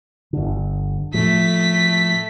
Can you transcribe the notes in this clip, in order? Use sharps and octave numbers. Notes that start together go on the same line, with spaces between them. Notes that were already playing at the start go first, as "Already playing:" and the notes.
G1 D3
A2 F3 A3 B6